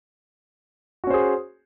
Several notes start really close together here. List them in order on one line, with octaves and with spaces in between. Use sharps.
F#4 C#4 C5 G#4